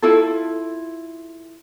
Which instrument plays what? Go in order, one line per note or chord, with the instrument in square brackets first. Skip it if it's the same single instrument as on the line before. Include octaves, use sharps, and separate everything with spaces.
[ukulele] E4 F4 A4